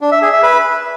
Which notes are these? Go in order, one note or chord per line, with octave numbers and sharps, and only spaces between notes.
D4
E5
G#4
E5
B4